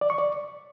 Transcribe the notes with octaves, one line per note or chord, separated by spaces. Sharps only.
D5
C#6
D5